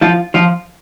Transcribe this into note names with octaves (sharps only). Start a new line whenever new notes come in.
F3 F4
F3 F4